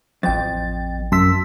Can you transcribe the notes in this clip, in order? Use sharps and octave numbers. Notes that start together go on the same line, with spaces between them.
A1 F2 G5 A6
F#2 A5 C6 E6 B6